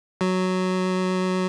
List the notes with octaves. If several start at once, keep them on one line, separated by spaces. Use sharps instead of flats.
F#3